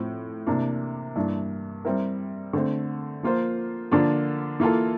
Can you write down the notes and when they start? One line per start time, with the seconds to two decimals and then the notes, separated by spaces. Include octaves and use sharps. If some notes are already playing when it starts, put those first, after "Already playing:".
Already playing: A2 F3 C4
0.47 C3 E3 A#3 D4
1.16 G2 E3 A#3 D4
1.85 G3 C4 E4 A#4
2.53 D3 A3 C4
3.23 F3 A#3 F4 C5
3.91 D3 F3 A#3 D4 F4
4.60 E3 A#3 F4 A4